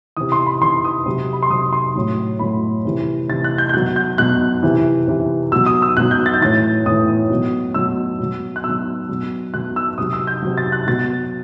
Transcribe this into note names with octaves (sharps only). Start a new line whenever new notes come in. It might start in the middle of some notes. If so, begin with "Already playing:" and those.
C3 E3 D#6
C6
B5
C3 E3 C6
D#6
C3 F#3
B5
C6
C3 F#3 D#6
C6
A2 F#3
A2 F#3 B5
C3 E3
C3 E3 A6
F#6
G6
G6
B2 F#3 F#6
G6
B2 F#3 F#6
C3 E3
C3 E3
B2 F#3 E6
D#6
E6
B2 F#3 F#6
G6
A6
G6
A2 E3 A6
A2 E3 D#6
B2 F#3
B2 F#3 E6
B2 F#3
F#6
B2 E6
F#3
B2 F#3
B2 F#3 F#6
E6
C3 F#3 D#6
E6
G6
C3 F#3
A6
F#6
B2 F#3 A6